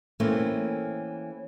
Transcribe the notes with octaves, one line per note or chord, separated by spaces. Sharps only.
E3 A3 A#3 C4 C#4